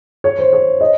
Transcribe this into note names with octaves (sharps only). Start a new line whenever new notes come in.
C#5
C5
C#5
D#5